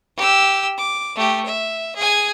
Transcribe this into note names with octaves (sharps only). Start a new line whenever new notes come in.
G4 E6
D6
A3 G4
E5
G#4 G#5